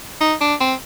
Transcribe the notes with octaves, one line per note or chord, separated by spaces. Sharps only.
D#4
D4
C4